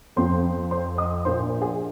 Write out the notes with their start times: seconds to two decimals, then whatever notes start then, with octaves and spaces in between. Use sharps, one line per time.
0.16 F2 F3 C4 C5 C6
0.71 C5 C6
0.98 D#5 D#6
1.25 A#1 A#2 A#3 C5 C6
1.61 G#4 G#5